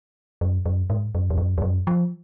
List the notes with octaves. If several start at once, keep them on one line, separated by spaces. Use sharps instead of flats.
F#2
F#2
G#2
F#2
F2
F#2
F2
F#2
F3